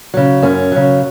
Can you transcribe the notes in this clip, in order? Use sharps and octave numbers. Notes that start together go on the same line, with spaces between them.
C#3 F#3
F#2 C#4
C#3 F#3